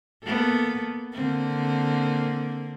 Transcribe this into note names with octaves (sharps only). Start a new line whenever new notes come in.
A#3 B3 A4
D3 A#3 C4